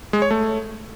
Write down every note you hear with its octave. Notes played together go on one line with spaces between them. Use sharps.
G#3
C#5
A3